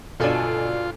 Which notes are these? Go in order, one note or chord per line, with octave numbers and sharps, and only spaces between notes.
G1 B2 D4 F4 A4 G#5